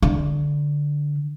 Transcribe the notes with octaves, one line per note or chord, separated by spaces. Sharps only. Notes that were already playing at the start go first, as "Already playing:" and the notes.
D3